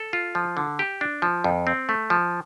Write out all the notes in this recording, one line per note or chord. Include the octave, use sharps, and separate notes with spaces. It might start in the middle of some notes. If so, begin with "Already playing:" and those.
Already playing: A4
F4
F3
D3
G4
D4
F3
F2
C4
A3
F3